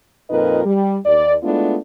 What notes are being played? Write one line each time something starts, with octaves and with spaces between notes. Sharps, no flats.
F2 A#2 D#4 A#4 B4 D#5
G3
D#2 D5
G#3 A3 B3 D4 E4 F4